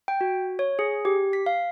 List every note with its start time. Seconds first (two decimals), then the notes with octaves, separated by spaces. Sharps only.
0.08 G5
0.21 F#4
0.59 C#5
0.79 G#4
1.05 G4
1.33 B6
1.46 F5